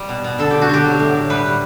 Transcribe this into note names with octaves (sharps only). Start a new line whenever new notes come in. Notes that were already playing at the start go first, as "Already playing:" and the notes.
Already playing: G3
B2
B2
D3 A4
D3 G4
F#4
D3 G4
F#3
A2
A2
G3 B4
G3